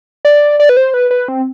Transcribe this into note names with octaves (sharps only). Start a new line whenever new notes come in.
D5
D5
B4
C5
B4
B4
C4